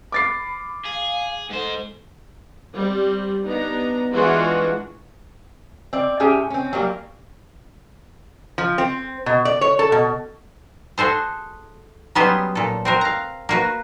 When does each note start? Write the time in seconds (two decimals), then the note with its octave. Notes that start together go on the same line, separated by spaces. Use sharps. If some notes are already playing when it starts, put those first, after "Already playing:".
0.12 B5 D6 A6 C7
0.85 G#4 F5
1.51 G#2 A4 C5
2.75 G3 C4
3.46 B3 D4 D#4 A#5
4.13 E3 G#3 D4 F4 F#4
5.93 C4 D5
6.20 A2 C#4 G4 G#4
6.50 C4 C#4
6.73 F#3 G3 A#3 G4
8.58 F3
8.78 C4
9.26 B2
9.45 D5
9.61 C#5
9.79 A4
9.92 B2
10.98 F#4 G#4 A4 C5
12.15 F#3 G3 B3 C#4 G#4 C5
12.55 A#2 A4
12.85 C4 F#4 A#4
13.01 F5 A#5
13.49 A#3 F#4 B4